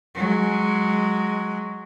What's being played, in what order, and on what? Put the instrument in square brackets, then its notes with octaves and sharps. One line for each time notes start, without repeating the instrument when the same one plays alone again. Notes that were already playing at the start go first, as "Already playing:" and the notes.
[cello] F#3 G#3